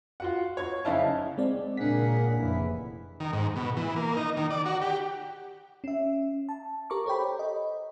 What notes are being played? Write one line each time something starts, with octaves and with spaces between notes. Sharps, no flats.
F4 F#4 F#5
C#5 G#6
F#1 C#4 D#4 E4 F5 A5
G#3 C4 D5
A#2 C#3 A#3 D4 G#4 A#4 F#5 B6
F1 E3 E4
D#3
G#2
B2
E3
A#3
D#4
D#3
D5
F#4
G4
C#4 E5
A5
G4 A#4 A#5 C#6 D6
A4 C5 C#5 G5 B5
D#5